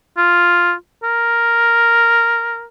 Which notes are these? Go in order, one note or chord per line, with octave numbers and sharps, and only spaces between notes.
F4
A#4